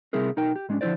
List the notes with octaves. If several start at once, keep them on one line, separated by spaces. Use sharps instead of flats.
C3 G3 C4 E4 G#4 A#4
B1 D#4 A#4 G5
G4
G#2 G#3 C#4 D4
D3 F3 A3 E4 C5 D5